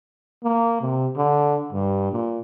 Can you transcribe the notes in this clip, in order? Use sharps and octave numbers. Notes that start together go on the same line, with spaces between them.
A#3
C3
D3
G2
A#2